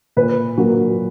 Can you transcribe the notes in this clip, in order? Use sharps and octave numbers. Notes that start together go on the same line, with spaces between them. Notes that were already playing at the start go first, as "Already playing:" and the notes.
A#2 B4
F#3 A#3